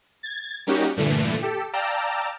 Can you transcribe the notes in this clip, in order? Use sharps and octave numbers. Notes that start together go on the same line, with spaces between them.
G#6 A6
G3 A#3 C#4 D#4 F#4 G4
G2 A#2 D3 E3 A3
G4 A4
D5 F5 G5 A5 A#5 E6